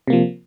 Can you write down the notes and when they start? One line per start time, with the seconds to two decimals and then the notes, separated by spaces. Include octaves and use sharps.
0.08 C3
0.10 A#3
0.13 F3